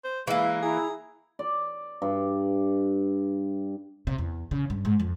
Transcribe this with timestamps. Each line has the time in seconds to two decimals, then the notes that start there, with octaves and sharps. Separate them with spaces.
0.04 C5
0.27 E3 G#3 A#3 E4 F5
0.63 E4 G#4 A#5
1.39 D5
2.02 G2
4.07 C3
4.18 E2
4.51 C#3
4.70 G2
4.85 G#2
5.00 F2